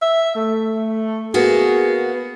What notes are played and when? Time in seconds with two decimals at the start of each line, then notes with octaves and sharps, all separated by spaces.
0.02 E5
0.35 A3
1.34 A#3 B3 F#4 G#4